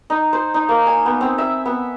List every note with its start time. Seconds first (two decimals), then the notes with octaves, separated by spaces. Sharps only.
0.10 D#4
0.33 C5
0.54 D#4
0.69 A#3
0.86 G#5
1.06 B3
1.21 C4
1.38 E5
1.66 B3